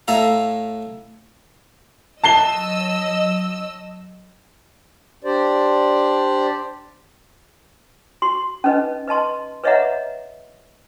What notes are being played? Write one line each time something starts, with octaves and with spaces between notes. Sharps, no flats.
A2 A4 E5 F5 A#5
F#3 D#5 A5 E6 C7 G7
D4 G4 C5 D5
F#4 C6
C#4 D#4 B4 D#5
B4 D#5 A5 C6
B4 C#5 D#5 E5 F#5 A#5